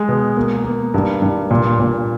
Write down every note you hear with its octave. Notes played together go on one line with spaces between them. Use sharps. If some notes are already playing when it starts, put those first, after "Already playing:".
Already playing: G#3
B2
A#3
A#3
G2
G2
A#2
A#2